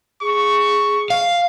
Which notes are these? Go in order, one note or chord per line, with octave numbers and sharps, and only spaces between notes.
G#4 C#6
F5